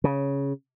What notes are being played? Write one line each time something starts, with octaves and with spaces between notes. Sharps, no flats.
C#3